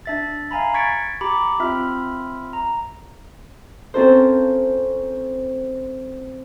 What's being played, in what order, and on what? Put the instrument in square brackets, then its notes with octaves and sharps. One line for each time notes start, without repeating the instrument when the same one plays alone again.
[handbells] D4 E5 A6
F5 G#5 A#5 B5
C#6 G#6 A6 B6 C#7 D7
G4 A#5 B5 D6
C4 F4 E5 B5 F6
A#5
[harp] C4 C#4 F4 A4 A#4 C5